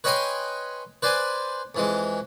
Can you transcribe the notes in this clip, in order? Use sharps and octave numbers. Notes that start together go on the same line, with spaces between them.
B4 C#5 D#5 G5 G#5 C6
B4 C5 D5 G#5
F2 E3 G#3